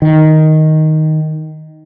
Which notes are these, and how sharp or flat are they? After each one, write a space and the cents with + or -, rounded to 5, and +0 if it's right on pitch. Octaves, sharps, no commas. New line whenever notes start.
D#3 +5